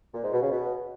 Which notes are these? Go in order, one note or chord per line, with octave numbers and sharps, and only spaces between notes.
A#2
G#2
B2
C#3
B2